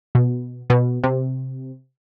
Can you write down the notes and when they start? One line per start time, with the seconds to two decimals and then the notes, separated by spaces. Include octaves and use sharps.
0.15 B2
0.70 B2
1.04 C3